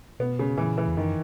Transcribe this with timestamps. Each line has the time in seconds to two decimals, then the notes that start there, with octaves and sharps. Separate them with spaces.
0.20 B2 B3
0.39 C#3
0.58 A#2 E3
0.78 E3
0.88 E2
0.97 F#2 D#3